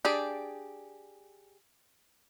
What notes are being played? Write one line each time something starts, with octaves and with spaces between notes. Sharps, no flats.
D4 G4 G#4 D5